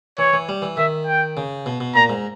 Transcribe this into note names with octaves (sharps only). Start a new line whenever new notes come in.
E3 C#5
E3
G3
E3
D#3 E5
G5
C#3
B2
B2
A#2 A#5
G#2